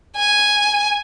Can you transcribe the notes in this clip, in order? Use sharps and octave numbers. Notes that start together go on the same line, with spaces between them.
G#5